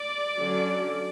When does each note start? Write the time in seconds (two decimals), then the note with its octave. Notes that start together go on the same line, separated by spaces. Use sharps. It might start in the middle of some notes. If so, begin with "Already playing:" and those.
Already playing: D5
0.38 D3 F#3 C#4